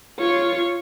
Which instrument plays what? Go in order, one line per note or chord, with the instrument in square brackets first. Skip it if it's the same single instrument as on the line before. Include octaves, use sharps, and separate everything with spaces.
[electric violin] F4 C#5